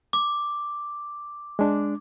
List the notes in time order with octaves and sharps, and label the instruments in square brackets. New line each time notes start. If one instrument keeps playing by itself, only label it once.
[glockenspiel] D6
[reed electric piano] G#3 D4